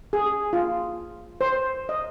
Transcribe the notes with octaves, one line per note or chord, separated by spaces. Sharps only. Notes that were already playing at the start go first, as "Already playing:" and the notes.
G#4
F4
C5
D#5